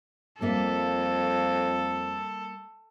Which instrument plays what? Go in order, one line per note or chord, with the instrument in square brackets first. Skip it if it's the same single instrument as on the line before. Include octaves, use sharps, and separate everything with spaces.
[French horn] F2 [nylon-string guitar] G3 A#3 E5 [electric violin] A4